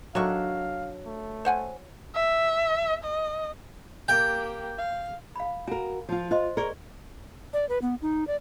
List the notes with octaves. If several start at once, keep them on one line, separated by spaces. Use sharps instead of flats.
D#3 F#3 D4 A4 E5 F5 C#6
A3
C5 F#5 G#5
E5
D#5
A#3 G4 G5
F5
F5 B5
F#4 A#4 G#5
F3 F4
F4 C5 D#5 C6
G#4 A#4 D5 C#6
D5
B4
B3
D#4
D5